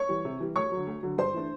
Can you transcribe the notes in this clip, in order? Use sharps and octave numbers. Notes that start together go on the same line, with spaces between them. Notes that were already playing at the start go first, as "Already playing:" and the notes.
Already playing: C#5 C#6
E3 G3
C3
E3 G3
D2 C#5 C#6
D3 F#3
D2
D3 F#3
G2 C5 C6
E3 A3 D4